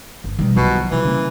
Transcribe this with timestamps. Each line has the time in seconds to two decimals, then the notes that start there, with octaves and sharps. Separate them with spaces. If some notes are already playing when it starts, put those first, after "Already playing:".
0.24 G1
0.39 B2 D#3 G3
0.56 C2 B2 D#3 F3 F#3
0.91 C3 E3 G3
1.05 C#3 A#3